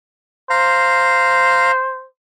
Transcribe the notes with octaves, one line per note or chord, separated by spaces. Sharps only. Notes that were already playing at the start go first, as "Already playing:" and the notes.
C5 F5 A#5